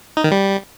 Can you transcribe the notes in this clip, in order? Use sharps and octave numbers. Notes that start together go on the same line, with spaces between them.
D#4
D#3
G3